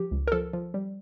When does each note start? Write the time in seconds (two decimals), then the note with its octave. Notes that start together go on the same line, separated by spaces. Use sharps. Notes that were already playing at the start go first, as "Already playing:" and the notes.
Already playing: F3 G4
0.11 C#2
0.28 A#4
0.32 F3 A4
0.53 F3
0.74 G3